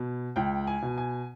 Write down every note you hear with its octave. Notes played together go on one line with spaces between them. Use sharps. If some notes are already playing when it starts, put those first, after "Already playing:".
Already playing: B2
C#2 G5
G#5
B2
G#5